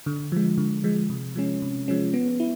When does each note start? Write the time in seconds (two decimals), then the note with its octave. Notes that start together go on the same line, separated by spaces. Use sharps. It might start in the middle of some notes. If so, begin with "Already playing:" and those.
0.06 D3
0.32 F3 G#3
0.58 D3
0.84 F3 G#3
1.10 C3
1.36 F3 G#3 C#4
1.62 C3
1.88 F3 G#3 C#4
2.14 B3
2.40 E4